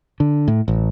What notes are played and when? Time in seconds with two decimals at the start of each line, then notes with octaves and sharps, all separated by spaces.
0.20 D3
0.48 A2
0.68 A1